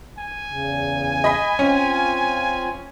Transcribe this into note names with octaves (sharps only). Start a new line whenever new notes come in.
G#5
E2 C#3
D#5 B5 B6
C4 C#4 F4